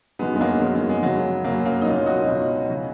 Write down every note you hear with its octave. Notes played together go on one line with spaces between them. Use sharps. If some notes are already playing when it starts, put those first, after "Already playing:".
F#2 D#3 F#3 G#3 B3
G#3
F#3 A#3
F#2 D#3 F#3 G#3
F#3
G#3
F#2 C#3 F#3
F#2 C#3 F#3 A#3
A#3 C#4
D#4
C#2 B2 F#3 C#4 F4
D#4 F#4
C#2 B2 F#3
C#3 F#3